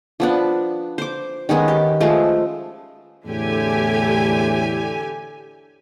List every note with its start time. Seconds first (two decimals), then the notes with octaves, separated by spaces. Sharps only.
0.20 F3 B3 D4
0.98 C5 D6
1.49 D#3 G#3 B3 C#4
1.68 G4
2.01 F3 G#3 A3
3.27 E2 A2 D3 G4 G#5